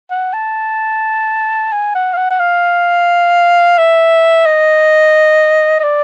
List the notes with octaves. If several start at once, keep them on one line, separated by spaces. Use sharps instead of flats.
F#5
A5
G#5
F#5
F5
F#5
F#5
F5
E5
D#5
D#5
D5